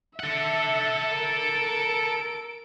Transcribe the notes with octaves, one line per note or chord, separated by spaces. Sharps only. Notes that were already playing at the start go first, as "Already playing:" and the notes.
A4 E5 F#5
A#4 D7